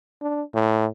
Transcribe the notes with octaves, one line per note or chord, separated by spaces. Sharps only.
D4
A2